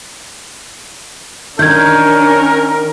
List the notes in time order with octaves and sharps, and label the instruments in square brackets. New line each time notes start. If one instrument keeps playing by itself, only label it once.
[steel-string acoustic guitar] D#3 [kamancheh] C#4 D4 [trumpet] A#4 [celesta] G6 G#6